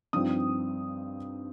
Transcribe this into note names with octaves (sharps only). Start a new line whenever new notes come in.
G2 F3 C4 D#4 D#6